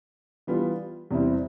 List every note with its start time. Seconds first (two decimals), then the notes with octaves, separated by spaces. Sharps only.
0.47 E3 G3 B3 F4
1.11 E2 C3 G3 C4 E4